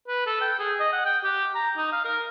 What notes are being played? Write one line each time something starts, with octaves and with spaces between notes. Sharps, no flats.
B4
A4
G5
G#4
D#5
F#5
G5
G4
A#5
D#4
F5
A#4